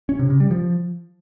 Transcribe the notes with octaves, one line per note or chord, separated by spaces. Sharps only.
C#4
C3
C#3
G3
F3